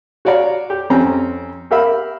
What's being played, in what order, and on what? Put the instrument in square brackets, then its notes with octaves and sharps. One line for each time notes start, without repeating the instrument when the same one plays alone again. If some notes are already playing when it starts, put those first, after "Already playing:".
[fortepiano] F#4 C#5 D5 F5 A#5
G4
F2 C4 C#4 A#5
G4 A#4 E5 F5 B5 E6